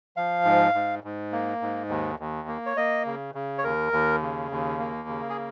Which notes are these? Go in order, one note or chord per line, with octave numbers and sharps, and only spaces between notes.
F3 F5
G#2
G#2
G#2
A#3
G#2
D#2
D#2
A#3
C#5
A#3 D#5
C#3
C#3
C#5
D#2 A#4
D#2
C#3
D#2
A#3
C#3
G#4